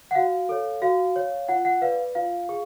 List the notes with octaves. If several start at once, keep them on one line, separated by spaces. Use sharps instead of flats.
F#5
F#4 F5
A4 C#5
F#4 F5
C#5
F4 F#5
F#5
B4 D5 F5
F4 F5
G#4